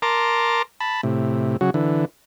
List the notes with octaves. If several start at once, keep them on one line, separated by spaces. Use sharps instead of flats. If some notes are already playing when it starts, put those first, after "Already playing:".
A#4 A5 A#5 C6 D6
A5 B5
A2 C3
C#3 F#3 F#4
D3 E3